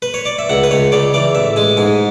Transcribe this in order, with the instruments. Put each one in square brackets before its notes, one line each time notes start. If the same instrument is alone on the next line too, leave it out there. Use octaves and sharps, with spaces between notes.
[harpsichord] B4
C#5
D5
E5
C#2 F#5
B4
C#2 C#5
C#3 D5
E3 D5
A1 E5
G#3 G#5
G#2 G#5